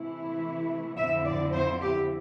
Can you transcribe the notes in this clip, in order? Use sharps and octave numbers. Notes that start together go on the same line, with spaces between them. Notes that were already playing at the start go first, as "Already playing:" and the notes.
Already playing: C3 E3 A3 E4
F2 D3 F3 C4 E4 E5
D5
C5
G4